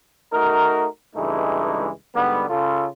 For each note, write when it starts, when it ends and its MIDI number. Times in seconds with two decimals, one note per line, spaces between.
0.33 0.87 57
0.33 0.87 63
0.33 0.87 66
0.33 0.87 70
1.16 1.89 37
1.16 1.89 43
1.16 1.89 52
1.16 1.89 56
1.16 1.89 57
1.16 1.89 63
2.15 2.46 44
2.15 2.46 50
2.15 2.46 55
2.15 2.46 59
2.49 2.87 49
2.49 2.87 65
2.49 2.87 69